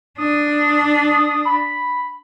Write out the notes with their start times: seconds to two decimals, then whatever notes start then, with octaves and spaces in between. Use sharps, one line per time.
0.18 D4 D#6
1.45 B5